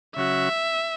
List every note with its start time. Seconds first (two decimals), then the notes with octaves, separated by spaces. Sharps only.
0.16 C#3 F#3 C#4 F#4 E5